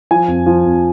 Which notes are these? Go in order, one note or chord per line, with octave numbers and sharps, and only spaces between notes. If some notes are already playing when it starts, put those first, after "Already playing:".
F3 G#5
F2
F3
F2